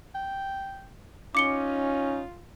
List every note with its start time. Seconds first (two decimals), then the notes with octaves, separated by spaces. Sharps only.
0.15 G5
1.35 C#4 D#4 F4 D6 C#7 G7